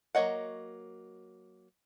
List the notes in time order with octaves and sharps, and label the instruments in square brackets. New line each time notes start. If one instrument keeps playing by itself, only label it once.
[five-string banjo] F#3 A#3 C#5 D#5 F#5